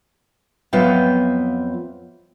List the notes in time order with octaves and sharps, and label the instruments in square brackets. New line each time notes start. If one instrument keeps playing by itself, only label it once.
[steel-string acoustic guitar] F2 F#3 B3 F4 E5 G5